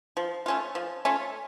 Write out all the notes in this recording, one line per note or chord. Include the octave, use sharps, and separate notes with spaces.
F3
A3 C#4 F4
F3
A3 C#4 F4